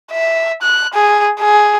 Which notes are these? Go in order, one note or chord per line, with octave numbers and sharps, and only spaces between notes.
E5
F#6
G#4
G#4